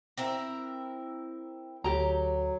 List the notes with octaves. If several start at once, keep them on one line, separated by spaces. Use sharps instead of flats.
C4 E4 A#4
D2 F#3 G4 A#5